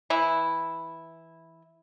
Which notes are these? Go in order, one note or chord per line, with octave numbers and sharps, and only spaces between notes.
E3 E4